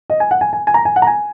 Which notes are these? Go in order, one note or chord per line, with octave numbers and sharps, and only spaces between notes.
D#5
G#5
F#5
G#5
G#5
G#5
A#5
G#5
F#5
A#5
G#5